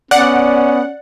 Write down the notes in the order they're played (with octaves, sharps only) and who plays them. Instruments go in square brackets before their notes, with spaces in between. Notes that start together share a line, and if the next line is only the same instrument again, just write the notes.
[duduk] B3 [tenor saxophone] C#4 [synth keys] D5 [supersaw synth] F#5